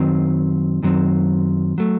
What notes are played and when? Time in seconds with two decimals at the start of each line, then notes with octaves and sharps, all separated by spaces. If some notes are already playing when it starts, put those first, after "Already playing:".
Already playing: F#2 D#3 F#3 C4
0.83 F#2 D#3 F#3 C4
1.78 F#3 A3